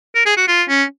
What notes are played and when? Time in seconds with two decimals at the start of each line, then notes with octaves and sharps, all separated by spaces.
0.15 A#4
0.26 G#4
0.37 F#4
0.48 F4
0.69 C#4